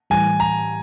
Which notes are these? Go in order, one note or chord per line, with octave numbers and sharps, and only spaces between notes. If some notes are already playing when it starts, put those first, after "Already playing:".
A2 E3 G3 G#5
A#5